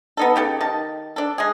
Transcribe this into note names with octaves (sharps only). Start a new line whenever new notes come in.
B3 D#4 A4
C#3 G4 A4
D#3 A5
D4 A4
G#3 G#4